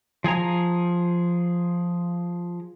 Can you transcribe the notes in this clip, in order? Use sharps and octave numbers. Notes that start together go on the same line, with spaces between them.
F3 G#4 G#5 A#5